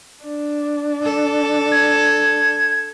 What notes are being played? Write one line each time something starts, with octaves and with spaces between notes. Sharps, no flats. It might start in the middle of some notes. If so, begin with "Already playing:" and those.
D4
A4
G#6